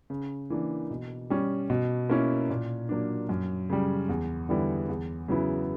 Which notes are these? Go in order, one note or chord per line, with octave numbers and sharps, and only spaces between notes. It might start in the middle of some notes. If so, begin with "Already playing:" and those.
C#3
E3 A#3 D4
B2
G3 C#4
B2
A#3 C#4 E4
A#2
F#3 A#3 D4
F#2
C#3 G3
E2
D3 G3 B3 E4
E2
C#3 F#3 B3 E4